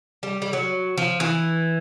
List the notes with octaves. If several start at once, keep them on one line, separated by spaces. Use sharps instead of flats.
G3
G3
F#3
F3
E3